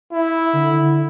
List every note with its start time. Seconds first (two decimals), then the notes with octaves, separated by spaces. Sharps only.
0.12 E4
0.53 D3